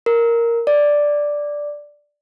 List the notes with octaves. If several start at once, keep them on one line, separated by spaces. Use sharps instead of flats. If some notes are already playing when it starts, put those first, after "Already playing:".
A#4
D5